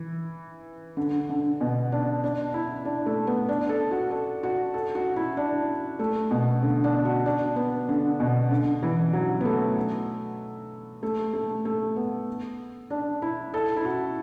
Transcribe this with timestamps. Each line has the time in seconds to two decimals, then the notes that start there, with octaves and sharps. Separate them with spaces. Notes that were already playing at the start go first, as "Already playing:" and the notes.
Already playing: E3
0.97 D3
1.29 D3
1.61 B2
1.92 D4
2.24 D4
2.54 E4
2.85 D4
3.06 A3
3.27 B3
3.49 D4
3.69 A4
3.91 F#4
4.11 A4
4.43 F#4
4.74 A4
4.95 F#4
5.16 E4
5.37 D4
5.99 A3
6.31 B2
6.62 D3
6.84 D4
7.05 F#4
7.26 D4
7.56 B3
7.89 D3
8.20 B2
8.51 D3
8.83 E3
9.13 F#3
9.41 B3
9.45 A3
11.03 A3
11.33 A3
11.65 A3
11.96 B3
12.90 D4
13.22 E4
13.54 A4
13.76 E4
13.85 F#4